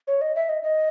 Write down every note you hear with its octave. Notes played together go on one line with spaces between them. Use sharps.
C#5
D#5
E5
D#5
D#5